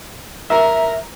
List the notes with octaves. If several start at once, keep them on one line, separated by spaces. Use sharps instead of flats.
A#4 E5